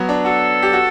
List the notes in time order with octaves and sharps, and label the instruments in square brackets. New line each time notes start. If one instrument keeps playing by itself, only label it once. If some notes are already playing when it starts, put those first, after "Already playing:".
Already playing: [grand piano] F#3 B3
D4
[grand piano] F#4 [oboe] A4
[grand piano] G4
F#4